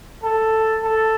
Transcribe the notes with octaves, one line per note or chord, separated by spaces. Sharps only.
A4
A4